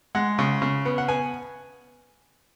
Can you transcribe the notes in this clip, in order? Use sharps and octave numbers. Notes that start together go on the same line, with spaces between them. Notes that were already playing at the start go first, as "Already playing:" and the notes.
G#3 F#5
C#3
C#3
B3
F#5
B3 G#5